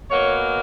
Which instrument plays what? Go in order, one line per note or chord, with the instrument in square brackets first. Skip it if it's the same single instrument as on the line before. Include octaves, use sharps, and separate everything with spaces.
[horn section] B2 F#3 A#3 C#5